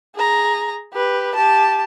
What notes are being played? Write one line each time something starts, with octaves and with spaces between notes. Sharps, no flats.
G#4 A#5
G4 B4
G4 A5